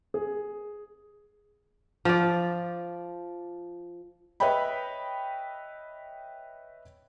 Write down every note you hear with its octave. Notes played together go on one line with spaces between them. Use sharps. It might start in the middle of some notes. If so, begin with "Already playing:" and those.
G#4
F3 D5
B4 C#5 D#5 E5 G5 B5